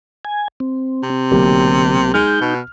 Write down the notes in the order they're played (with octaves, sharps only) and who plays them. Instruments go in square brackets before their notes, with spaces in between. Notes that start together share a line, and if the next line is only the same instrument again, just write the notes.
[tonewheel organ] G#5
C4
[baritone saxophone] C3
[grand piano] B1 A#3 G4 [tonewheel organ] D3
[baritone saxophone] G#3 [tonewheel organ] D#4 G6 [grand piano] F6
[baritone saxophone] B2